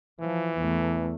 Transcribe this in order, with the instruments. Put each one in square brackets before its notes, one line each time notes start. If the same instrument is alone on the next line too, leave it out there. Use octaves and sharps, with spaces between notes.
[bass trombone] E3 [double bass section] F3
[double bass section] E2 A3